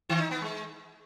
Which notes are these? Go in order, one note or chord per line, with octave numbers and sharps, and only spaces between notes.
D#3
D#4
B3
G#3